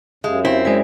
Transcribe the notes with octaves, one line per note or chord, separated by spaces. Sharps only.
F#2 G#3 G4 E5 F5
C4 E4
G#3 E4 C5 D5 G#5